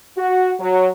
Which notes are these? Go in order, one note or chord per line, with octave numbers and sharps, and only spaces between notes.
F#4
F#3